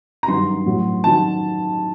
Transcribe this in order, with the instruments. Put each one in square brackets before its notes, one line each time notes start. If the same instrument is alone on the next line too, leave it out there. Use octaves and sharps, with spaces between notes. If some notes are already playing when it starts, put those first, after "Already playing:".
[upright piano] A#5
G2 D#3 F#3 C6
A2 F#3
D#3 F#3 A5